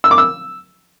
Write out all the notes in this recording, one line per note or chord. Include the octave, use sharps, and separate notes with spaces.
E6
D6
E6